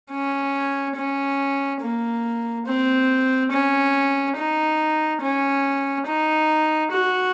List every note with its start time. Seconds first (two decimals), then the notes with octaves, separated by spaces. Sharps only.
0.11 C#4
0.96 C#4
1.82 A#3
2.66 C4
3.52 C#4
4.36 D#4
5.21 C#4
6.06 D#4
6.91 F#4